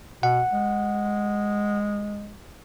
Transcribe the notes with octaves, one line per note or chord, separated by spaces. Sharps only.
B2 F#5
G#3